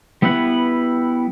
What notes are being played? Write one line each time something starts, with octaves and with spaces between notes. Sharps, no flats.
G3 B3 E4 B4 F#5